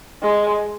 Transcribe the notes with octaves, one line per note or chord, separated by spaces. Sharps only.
G#3